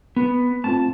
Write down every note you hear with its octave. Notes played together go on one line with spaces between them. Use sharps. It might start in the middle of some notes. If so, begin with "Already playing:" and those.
B3
A3 C4 F4 A5